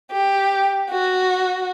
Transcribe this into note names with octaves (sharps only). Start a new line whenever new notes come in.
G4
F#4